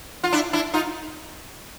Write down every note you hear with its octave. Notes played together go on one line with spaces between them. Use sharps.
F4
D4 E4
D4 E4
D#4 F4